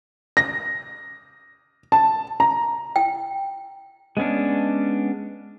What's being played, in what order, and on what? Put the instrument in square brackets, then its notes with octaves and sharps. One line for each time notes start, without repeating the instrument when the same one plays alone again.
[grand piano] A#6
A5
A#5
[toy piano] G5
[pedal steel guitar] G#3 B3 C#4 D4